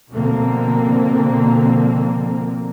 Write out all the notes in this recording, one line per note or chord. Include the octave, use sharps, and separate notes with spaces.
B2 D3 F3 A#3 C4